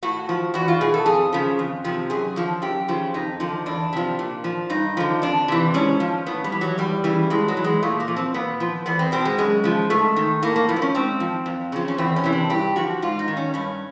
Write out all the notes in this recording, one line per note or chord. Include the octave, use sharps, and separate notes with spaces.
A2 F#4
F3
E2 F#4
F4
B2 G#4
A4
F2 G#4
C#3 F3
F2
C3 F3
F#2 G#4
D3 F3
F#2 G4
C#3 F3
F2 D#4
D3 F3
E2 D4
C3 F3
A#2
F3
G2 D#4
D3 F3
F2 D4
C3 E3
G#2 C#4
F3
A2 B3
G3
E3
F#3
E2 G3
C#3 E3
G2 G#3
F#3
E3
G#3
A#2 A3
A#3
F3
C4
A#2 B3
F3
E2 B3
C4
B2 C4
G#3
F#2 G#3
C#3 F3
G#2 A3
D#3
A2 A#3
A#3
F3 B3
C4
C#4
G#2 C4
F3
F2
C#3 F3
C#4
E2 C4
C#4
C3 E3
D4
G2 G4
D3 F3 F#4
G#2 F4
D#4
D#3
C#4
G2 C#4